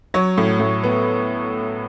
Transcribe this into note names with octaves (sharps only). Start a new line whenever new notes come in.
F#3 C#5
A2
A2
B3